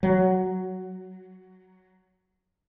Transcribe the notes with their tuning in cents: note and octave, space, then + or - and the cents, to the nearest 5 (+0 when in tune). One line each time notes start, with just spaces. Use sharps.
F#3 +5